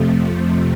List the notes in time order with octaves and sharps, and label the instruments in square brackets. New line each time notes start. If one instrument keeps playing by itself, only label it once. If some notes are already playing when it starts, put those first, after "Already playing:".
Already playing: [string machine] F2 C3 F3 A3